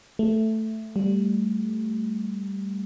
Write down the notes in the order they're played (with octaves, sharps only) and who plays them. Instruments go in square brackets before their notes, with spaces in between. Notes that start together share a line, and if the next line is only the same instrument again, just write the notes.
[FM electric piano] A3
G3